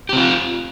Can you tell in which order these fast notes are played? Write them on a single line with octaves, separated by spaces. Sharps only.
G4 C4 F4